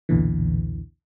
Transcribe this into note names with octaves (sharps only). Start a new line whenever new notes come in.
B1 E2 A#2 D3 E3